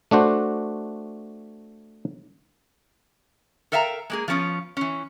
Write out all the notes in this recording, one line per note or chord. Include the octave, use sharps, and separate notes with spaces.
A3 D4 F#4 C5
A4 A#4 E5 F5 G5 A#5
G#3 A#3 G#4
F3 B3 C#4 F4
E3 C#4